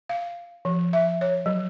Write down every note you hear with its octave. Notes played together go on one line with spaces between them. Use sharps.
F5
F3
E5
C#5
F#3